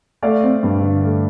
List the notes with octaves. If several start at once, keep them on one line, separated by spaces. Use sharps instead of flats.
A3 D5 F5
C4
G2
D3
A3